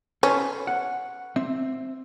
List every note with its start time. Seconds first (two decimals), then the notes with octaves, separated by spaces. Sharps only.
0.23 C#4 A4 B4 C5
0.67 F#5
1.36 C4 E5